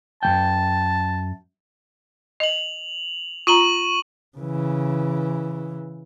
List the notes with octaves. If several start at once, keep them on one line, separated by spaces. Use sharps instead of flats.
F#2 F3 G5 A5
D#5 F7 F#7
F4 A#5 C#6 D#7 F#7
C#3 E3